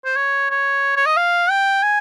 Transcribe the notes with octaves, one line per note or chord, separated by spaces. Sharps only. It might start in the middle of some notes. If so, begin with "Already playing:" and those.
C5
C#5
C#5
C#5
D#5
F5
G5
G#5